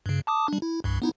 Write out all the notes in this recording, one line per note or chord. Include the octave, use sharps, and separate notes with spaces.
G2 C#3
A5 D6 D#6
G3 D4
E4
C2 G2
B3 D#4 E4